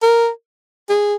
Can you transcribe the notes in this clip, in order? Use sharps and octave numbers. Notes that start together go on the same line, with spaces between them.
A#4
G#4